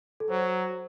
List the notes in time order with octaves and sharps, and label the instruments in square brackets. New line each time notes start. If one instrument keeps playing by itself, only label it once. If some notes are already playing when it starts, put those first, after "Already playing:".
[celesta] A4
[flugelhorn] F#3 [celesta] C5